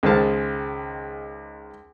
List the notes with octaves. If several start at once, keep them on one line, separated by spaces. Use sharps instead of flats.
C#2 D#3 G#3 C5 F5 A5